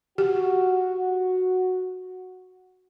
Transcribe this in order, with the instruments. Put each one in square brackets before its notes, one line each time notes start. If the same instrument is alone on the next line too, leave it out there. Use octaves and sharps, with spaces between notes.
[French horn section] F#4 [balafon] G4